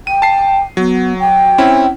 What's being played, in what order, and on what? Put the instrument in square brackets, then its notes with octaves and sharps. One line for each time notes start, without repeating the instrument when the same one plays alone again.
[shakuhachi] G5 [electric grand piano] D#7
[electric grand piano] A5 C7
[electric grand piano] F#3 [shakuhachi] B3
[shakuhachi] G5
[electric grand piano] C4 C#4 E4